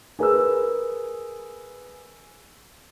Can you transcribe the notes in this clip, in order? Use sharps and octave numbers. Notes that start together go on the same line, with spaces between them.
G#4 A#4 B4 E6